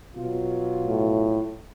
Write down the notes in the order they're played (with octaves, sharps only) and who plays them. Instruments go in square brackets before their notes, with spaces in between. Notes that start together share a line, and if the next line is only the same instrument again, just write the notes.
[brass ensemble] B2 F#3 F4
[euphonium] A2